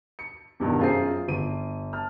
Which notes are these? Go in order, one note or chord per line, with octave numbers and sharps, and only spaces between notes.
C#7
E2 G2 B2 D#3
F#2 F4 G#4 C5 C7
G1 D#7
A5 F6